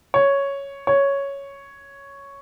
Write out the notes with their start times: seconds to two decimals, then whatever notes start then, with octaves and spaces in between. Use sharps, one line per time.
0.14 C#5
0.87 C#5